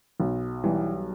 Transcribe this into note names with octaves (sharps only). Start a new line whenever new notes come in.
B1
E3 G3